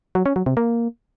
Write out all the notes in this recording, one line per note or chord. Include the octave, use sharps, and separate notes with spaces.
F#3
C#4
F#3
C3
A#3